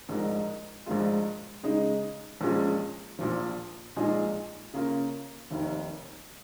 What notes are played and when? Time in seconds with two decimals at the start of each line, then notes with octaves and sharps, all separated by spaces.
0.09 A#1 G#2 G#3 D#4 A#4
0.86 A#1 G#2 G#3 F4
1.63 C#3 G#3 D#4
2.41 A#1 A#2 G#3 C#4
3.19 A#1 A#2 F3
3.96 A#1 A#2 G#3 D#4 G#4
4.74 C#3 A#3 C#4 F4 A#4
5.51 F1 D#2 D#3